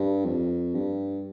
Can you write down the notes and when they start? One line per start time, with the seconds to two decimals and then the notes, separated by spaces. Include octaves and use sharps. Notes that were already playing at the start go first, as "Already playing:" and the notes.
Already playing: G2
0.25 F2
0.75 G2